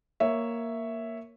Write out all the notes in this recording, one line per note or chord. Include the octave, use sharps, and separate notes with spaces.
A#3 C#5 E5